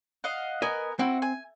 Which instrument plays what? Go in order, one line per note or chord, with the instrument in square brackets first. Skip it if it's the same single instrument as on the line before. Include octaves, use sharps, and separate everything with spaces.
[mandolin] D#5 F5 F#5
[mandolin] B3 A#4 G#5 [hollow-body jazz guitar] D#5
[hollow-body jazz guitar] C4 [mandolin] E4 F#4
[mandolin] G#5